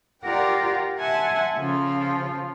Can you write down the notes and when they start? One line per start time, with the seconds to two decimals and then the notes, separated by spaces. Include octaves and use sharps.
0.23 F4 G4 A#4 D5 F#5 G5
0.97 E5 F#5 G#5 A5 C6
1.58 C#3 F3 F4 A4